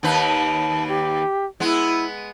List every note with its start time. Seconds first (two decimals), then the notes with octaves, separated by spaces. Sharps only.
0.03 D#2 D#3 B4 A5
0.87 G4
1.60 G#3 B3 E4